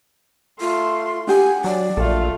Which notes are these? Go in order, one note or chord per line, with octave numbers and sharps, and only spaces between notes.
A3 F4 C6
D4 G4 F#5 G#5
F#3 D5
A#1 A3 F4 A4